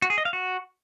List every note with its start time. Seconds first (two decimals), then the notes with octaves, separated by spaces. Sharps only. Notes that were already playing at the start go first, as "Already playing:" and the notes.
0.02 F#4
0.10 G#4
0.18 D#5
0.25 F5
0.33 F#4